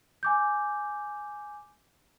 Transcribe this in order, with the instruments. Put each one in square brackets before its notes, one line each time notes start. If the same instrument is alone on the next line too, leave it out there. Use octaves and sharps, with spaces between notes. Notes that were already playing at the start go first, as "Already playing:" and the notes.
[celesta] G#5 D6 G6